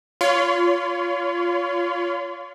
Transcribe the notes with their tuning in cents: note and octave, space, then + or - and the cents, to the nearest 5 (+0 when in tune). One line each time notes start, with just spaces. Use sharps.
F4 +0 C#5 +30 C6 -35